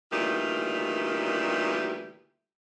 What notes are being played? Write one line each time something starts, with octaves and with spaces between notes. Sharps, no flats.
D2 A#2 D#3 E3 G3 G4